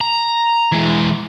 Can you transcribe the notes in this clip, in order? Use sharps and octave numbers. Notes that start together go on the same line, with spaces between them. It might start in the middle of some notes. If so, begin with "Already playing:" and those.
A#5
E3 G#3